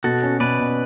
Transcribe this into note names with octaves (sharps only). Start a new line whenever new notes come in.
B2 F#4 A4
C#4
B2 B4 D5
B2